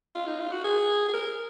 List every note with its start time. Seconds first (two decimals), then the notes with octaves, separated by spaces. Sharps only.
0.15 F4
0.27 D#4
0.40 F4
0.52 F#4
0.64 G#4
1.09 G#4
1.14 A#4